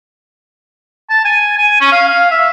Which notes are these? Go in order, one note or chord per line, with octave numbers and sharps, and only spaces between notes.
A5
G#5
G#5
C#4
F5
F5
E5